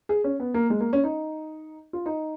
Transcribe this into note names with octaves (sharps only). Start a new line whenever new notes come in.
G#4
C#4
B3
A#3
G#3
A#3
C#4
D#4
F4
D#4